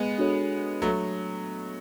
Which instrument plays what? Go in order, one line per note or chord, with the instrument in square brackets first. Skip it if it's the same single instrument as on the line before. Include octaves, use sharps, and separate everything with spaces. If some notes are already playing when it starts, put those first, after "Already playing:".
Already playing: [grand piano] G#3 B3
[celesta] D4 F#4 A4 C#5
[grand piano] F#3 A3